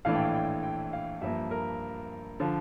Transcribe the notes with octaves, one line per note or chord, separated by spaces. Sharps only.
A#1 A2 E3 A3 D4 F5
G5
F5
G5
G5
F5
G2 F3 A#3 E5
A#4
D3 F3